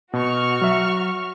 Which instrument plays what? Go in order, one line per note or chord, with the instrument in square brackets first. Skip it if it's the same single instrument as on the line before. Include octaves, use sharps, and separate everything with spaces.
[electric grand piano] B2 [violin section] F#4 C#6 F6
[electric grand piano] F#3 E5